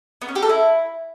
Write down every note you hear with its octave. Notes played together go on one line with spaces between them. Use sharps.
B3
C#4
G4
A4
E4